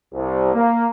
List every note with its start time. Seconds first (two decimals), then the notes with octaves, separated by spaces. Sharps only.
0.13 C2
0.53 A#3